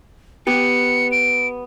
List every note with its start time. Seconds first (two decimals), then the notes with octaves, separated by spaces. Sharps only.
0.47 B3 G4 C#7
1.12 D7